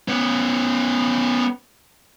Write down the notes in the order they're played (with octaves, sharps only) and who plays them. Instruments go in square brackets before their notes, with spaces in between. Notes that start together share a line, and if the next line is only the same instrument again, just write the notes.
[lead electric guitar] B3 C#4